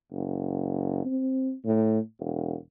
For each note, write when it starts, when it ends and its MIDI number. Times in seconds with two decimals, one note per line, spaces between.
0.12 1.02 30
1.05 1.53 60
1.65 1.99 45
2.19 2.55 28